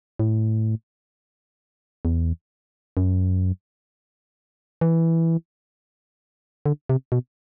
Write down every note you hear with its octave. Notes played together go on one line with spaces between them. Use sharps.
A2
E2
F#2
E3
D3
C3
B2